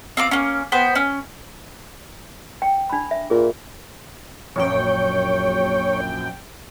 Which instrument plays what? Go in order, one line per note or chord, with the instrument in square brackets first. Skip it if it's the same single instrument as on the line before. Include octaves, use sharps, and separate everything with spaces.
[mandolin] C4 F4 D6
A#3 C#4
B3 B4 C5 G5
C#4
[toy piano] G5
D4 B5
E5
[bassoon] A#2 [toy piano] F4 G#4
[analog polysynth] A#1 F#2 G5 [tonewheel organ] C#5